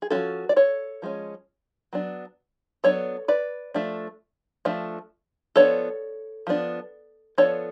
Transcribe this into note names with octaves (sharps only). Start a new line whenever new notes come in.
G#4
F3 G#3 C#4 F#4 A4
D5
A4 C#5
F3 G#3 C#4
F#3 B3 D4
F#3 B3 D4 A4 C#5
B4 D5
F3 A3 D4
F3 A3 D4
F3 B3 D4 A4 C#5
F3 B3 D4
F3 B3 D4 A4 C#5